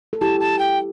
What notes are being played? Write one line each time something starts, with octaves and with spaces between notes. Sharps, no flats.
A4
E4 G4 A5
A5
G5